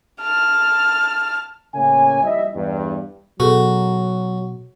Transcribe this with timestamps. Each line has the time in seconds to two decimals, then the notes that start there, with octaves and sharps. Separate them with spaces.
0.22 A5 F6
1.74 A2 C#3 A#3 C#4 G#5
2.24 A#1 G3 E4 D#5 E5
2.55 E2 G2
3.40 B2 F#3 F#4 G#4 A4